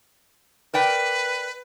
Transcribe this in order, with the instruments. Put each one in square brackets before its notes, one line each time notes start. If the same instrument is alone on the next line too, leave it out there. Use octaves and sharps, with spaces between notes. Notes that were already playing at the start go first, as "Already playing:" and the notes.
[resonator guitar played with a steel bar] A#4 D5 G5 [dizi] B4